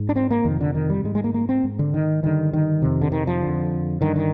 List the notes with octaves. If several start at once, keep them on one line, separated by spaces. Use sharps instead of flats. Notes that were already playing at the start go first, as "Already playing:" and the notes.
Already playing: G#2
D4
C4
A#3
F2 C3 D#3
D3
D#3
G3
G#2 G#3
G#3
A#3
A#3
C4
G#2
D3
D#3
G2 D3 D#3
D#3
F2 C3
D3
D#3
F3
F2 D3
G2 D3 D#3
D#3